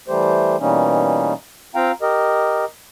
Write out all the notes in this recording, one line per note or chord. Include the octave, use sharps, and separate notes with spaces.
E3 G3 A3 G4 C5
B2 E3 G3 A#3 C#4 D#4
C4 F4 F5 G5 A#5
G4 A#4 D#5